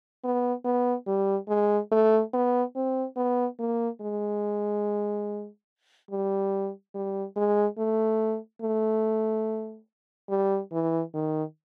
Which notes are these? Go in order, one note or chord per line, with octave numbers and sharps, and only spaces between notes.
B3
B3
G3
G#3
A3
B3
C4
B3
A#3
G#3
G3
G3
G#3
A3
A3
G3
E3
D#3